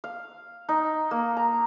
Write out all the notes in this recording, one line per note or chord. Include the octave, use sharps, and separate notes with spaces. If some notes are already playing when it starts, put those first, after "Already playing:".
F5
D#4
A#3
A#5